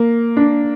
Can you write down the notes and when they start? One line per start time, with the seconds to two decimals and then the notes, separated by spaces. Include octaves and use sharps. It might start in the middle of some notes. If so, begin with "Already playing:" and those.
Already playing: A#3
0.37 D4